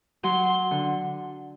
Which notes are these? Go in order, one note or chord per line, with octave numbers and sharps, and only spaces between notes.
F#3 C6
D3